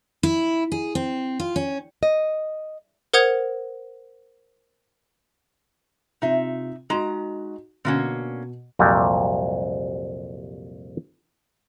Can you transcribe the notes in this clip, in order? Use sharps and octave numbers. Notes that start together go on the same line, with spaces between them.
E4
G#4
C4
F4
C#4
D#5
A#4 C5 F#5 D#6 G#6 F7
C3 D#4 F4 E5
G#3 D#4 F#4 A#5
B2 D3 A#3 C#4 F#4
C2 F2 A#2 F#3 G3